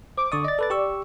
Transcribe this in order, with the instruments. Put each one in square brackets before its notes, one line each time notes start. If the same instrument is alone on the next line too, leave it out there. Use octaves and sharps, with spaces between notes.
[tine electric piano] C5 [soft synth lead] D6
[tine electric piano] D3 C#6 D#6 [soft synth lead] D5
[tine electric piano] D#5 A6
A4 B4 A6
G4 C#6 E6